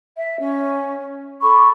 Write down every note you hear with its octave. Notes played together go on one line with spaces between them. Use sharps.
E5
C#4
A4 B5 C#6 D6